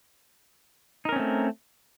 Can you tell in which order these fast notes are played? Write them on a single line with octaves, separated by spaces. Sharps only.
D#4 A#4 C#4 C4 A3